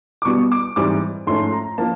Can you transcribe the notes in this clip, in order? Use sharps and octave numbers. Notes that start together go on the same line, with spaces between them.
D6
B2 G3 B3 C#6
D6
G#2 E3 G3 C4 D6
G#2 F3 A3 C#4 C6
A#5
F3 A#3 A5